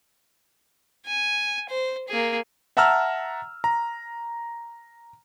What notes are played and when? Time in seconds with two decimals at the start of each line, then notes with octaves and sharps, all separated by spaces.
1.06 G#5
1.69 C5
2.09 A#3 G#4
2.77 E5 F#5 A5 A#5 E6 F6
3.64 A#5